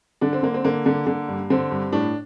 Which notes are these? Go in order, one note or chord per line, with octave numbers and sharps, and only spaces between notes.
D3 D4
C4
D3 A#3
C4
D3 A#3
D3
D3
G2
D3 C4
G2
A2 D4